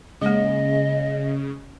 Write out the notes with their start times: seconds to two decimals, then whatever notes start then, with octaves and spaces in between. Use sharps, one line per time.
0.21 C#3 G#3 A#3 D#5